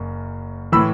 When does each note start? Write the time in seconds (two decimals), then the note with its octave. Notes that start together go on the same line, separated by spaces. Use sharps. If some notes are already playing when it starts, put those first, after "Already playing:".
Already playing: F#1 F#2
0.72 A2 E3 B5 E6